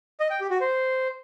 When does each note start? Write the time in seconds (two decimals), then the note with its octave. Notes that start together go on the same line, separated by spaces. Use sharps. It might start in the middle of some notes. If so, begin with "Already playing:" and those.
0.20 D#5
0.30 G5
0.40 G4
0.51 F#4
0.61 C5